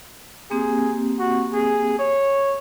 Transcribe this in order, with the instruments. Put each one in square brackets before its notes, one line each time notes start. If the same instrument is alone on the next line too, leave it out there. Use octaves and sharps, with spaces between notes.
[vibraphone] A#3 C4 G4 [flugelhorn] G#4
[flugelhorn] F#4
G#4
C#5